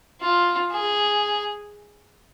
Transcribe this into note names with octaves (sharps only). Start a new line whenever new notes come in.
F4
G#4